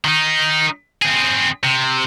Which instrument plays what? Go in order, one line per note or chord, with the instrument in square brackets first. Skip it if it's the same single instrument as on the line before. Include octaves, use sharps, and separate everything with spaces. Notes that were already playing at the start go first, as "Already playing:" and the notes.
[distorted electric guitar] D#3 D#4
C4 G#4
C3